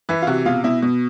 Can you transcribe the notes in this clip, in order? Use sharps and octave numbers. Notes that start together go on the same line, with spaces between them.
E3 B4
F4
C3 F#4
B2 F4
B2 E4
B2